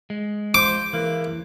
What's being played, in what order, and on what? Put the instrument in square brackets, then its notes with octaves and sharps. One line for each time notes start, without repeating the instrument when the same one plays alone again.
[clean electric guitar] G#3
[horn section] F3 C5 [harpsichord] D6
[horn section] C#3 A#3 E4 [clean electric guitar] E3